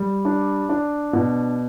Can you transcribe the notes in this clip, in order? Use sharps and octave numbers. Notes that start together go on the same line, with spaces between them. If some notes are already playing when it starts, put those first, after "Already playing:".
Already playing: G3
D4
D4
B2